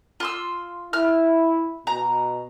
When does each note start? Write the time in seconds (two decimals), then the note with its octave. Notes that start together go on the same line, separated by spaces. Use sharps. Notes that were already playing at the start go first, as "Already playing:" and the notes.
0.20 F4 C6 E6
0.93 E4 F6
1.87 B2 A#5